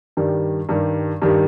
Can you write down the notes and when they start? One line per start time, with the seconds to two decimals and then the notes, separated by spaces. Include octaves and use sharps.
0.17 G2 D#3 G3
0.69 G2 D#3 G3
1.22 G2 D#3 G3